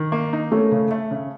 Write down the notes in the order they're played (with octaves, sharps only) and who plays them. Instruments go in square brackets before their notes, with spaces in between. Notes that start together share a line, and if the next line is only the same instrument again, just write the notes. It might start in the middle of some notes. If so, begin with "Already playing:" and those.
Already playing: [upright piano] D#3
A#3
D#4
[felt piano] A3 [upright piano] C#4
[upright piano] C#3
A3
C#3